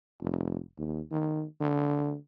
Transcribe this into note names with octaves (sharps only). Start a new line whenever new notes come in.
F1
D#2
D#3
D3